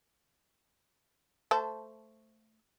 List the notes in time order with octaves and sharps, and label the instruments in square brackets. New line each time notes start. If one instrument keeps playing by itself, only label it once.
[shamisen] A3 C5 A5